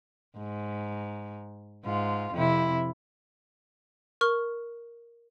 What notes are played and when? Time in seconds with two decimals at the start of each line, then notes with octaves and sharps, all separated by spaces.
0.37 G#2
1.85 G#2 F4
2.34 F2 C3 E4
4.21 A#4 C#6 F6